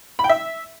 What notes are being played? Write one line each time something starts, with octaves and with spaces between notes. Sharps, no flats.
B5
G5
E5